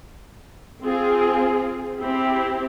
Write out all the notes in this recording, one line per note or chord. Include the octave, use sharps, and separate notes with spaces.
C4 F4 G#4
C4 E4 G4